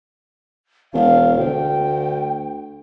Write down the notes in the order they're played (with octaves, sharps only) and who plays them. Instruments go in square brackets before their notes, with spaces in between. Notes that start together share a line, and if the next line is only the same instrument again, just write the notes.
[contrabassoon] E1 [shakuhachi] F5
[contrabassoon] D2 [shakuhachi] G5